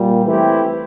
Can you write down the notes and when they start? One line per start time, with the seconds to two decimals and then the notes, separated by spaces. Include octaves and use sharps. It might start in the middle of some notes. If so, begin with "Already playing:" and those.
Already playing: A#2 G3
0.25 E3 A3 C4 E4 G4